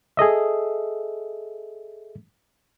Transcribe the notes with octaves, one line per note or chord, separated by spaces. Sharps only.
G#4 A4 D#5 E5